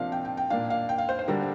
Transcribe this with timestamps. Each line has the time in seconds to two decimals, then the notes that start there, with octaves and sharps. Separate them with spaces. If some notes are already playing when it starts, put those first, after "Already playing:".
Already playing: C3 F3 A#3 D4 F5
0.12 G5
0.25 G5
0.37 G5
0.50 A#2 A#3 D4 F5
0.70 F5
0.89 G5
0.98 F5
1.09 C5
1.19 C5
1.28 D3 G3 D4 A#4